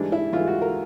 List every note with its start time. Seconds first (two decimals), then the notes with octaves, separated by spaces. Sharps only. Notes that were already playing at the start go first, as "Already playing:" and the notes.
Already playing: G#2 E3 G3 D4
0.12 E4
0.33 G#2 E3 G3 F4
0.47 F#4
0.62 A#4